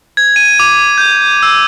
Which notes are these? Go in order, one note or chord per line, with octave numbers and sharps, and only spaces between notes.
G#6
D#7
D6
G6
E6